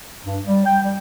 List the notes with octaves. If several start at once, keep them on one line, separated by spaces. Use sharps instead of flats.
G2
G3
G5
G3